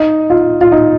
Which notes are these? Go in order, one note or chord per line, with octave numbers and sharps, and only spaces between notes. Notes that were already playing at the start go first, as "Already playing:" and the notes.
Already playing: D#4
F4
F4
D#4